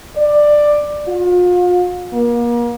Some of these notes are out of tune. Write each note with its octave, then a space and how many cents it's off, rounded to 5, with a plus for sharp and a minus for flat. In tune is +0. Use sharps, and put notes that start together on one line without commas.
D5 +10
F4 +40
A#3 +35